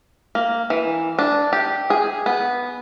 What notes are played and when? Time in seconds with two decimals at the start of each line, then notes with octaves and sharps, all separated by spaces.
0.35 A#3
0.70 E3
1.19 D4
1.53 G4
1.90 G#4
2.26 B3